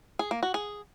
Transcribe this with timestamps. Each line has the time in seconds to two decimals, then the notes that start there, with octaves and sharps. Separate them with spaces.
0.19 G#4
0.31 A#3
0.43 F#4
0.54 G#4